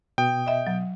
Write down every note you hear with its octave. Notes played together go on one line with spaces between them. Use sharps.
B2 G5 D#6
D#5 E5
F#3